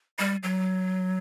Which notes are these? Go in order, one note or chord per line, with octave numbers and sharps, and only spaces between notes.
G3
F#3